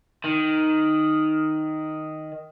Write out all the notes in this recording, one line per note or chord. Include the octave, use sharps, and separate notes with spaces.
D#3